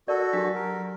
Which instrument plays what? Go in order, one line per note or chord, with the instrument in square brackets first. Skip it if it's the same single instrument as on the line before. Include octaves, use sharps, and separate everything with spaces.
[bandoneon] F#4 A4 [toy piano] A#4 D5
[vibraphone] F#3 [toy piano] D4 G4
[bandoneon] A#4